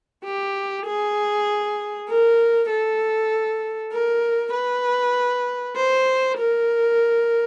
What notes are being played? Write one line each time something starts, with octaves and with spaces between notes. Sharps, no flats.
G4
G#4
A#4
A4
A#4
B4
C5
A#4